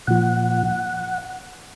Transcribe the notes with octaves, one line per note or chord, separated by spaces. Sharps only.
A#2 F3 F#5